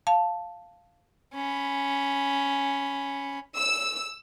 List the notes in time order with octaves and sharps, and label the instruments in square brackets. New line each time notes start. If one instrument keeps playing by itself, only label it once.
[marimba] F5 A5
[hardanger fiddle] C#4 B5
[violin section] E6